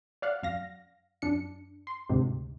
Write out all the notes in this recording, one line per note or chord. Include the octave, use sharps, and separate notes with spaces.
D5 F5 F#5
F#2 F5 A#6
F#2 D4 C#7
C6
D2 G#2 C3